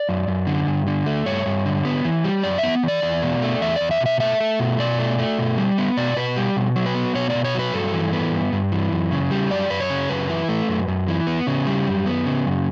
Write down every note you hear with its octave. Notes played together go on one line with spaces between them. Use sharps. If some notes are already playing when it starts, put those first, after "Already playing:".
Already playing: D5
F#2
F#2
D3
G2
D3
A3
G2 C#5
G2
D3
B3
E3
G3
F#2 D5
B3 E5
E3 D5
E2
B2
A3
E2 E5
E2 D5
E5
B2
E5
A3 E5
A3
B2
B2 D5
A3
A3
B2
G3
B3
B2 D5
B2 B4
G3 G4
B2
F#3
B4
B3
B2 C#5
D5
B2
C#5
F#3 B4
G2 A4
E3
B3
G2
G2
E3
F#2
C#3
G3
F#2 D5
F#2 B4
C#5
C#3
F#2 B4
E3
A3
F#2
F#2
E3
B3
C#3
G3
F#2
B3
C#3
F#2